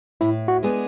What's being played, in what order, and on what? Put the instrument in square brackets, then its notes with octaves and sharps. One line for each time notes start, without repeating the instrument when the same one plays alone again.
[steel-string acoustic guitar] A2 [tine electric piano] E4
[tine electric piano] F#4
[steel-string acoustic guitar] G#3 B3 D4 G#4